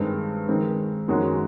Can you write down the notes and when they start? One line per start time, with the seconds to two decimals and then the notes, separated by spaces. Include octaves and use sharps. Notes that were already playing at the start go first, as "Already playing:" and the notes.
Already playing: G2 D#3 G#3 C4
0.48 D#3 G#3 C4
1.08 F#2 D#3 G#3 C#4 F#4